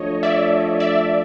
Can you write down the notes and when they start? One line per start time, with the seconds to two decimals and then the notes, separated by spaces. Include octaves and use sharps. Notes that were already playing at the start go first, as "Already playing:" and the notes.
Already playing: F3 A3 D4 F4 C#5 D#5
0.23 D5 E5
0.80 D5 E5